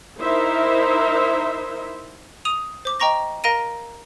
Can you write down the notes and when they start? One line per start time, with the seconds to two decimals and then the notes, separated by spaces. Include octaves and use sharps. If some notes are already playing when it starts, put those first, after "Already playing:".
0.19 D#4 E4 A#4 C5 E5
2.45 D#6 D#7 F7
2.85 C5 D6
3.00 D#5 G5 A#5 C#6 A#6
3.44 A#4 F5 A#5 A#6 D7 D#7